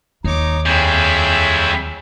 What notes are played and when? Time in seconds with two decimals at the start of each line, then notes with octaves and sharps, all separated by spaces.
0.24 D#2 D#4 C#5 D6
0.66 F2 G3 E4 G#4 C#5 G5